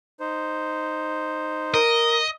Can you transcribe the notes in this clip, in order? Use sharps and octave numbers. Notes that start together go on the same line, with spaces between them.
D#4 C5
A#4 D#5